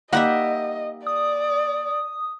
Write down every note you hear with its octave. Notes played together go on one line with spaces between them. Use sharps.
G3 A#3 D#4 G4 D#5 E5 F#5
D5 D#6